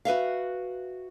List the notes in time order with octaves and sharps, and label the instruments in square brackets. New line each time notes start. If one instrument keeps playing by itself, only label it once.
[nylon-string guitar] F#4 B4 E5 F5